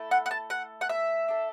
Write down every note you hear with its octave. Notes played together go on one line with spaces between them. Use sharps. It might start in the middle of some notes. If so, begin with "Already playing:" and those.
Already playing: A3 E4 A4
F#5
F#5
A5
F#5
F#5
E5
D4 A4